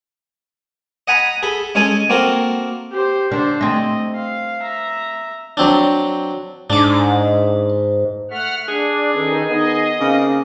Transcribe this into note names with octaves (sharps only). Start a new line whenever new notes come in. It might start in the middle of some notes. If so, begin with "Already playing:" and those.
D#5 F#5 G#5 A#5 B5
G#4 A4 B5
G#3 C#4 G#4 A4 G#5
A#3 C4 F#4 A4 A#4
G4 C5
D3 D4 C5
A3 C4 D#5
F5
E5 A#5
F#3 C4 D4
G#2 D4 D6
A3 F#5 F6
D4 G#4
D#3 C#4 D#4 A4 B4
D#3 B3 D#5
C#3 A#3 C4